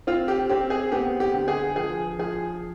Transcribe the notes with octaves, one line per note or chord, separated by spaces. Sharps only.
C4 F4
G4
C4 G4
G#4
B3 G4
G4
D3
G#4
F3 G#4
F3 G#4